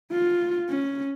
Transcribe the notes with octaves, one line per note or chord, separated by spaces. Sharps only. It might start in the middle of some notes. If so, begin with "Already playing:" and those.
F4
C#4